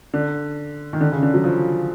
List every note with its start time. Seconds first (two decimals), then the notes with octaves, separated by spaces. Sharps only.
0.13 D3
0.93 D#3
1.01 D3
1.12 C#3
1.23 D3
1.34 F#3
1.44 F3